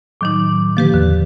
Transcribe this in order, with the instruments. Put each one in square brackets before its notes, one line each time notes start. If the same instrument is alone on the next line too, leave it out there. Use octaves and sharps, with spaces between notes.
[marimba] A2 D#3 D#4 [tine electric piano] F#3 D6
[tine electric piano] D3 D#3 A#3 [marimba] F3 G4 B4
[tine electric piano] E2 [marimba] D3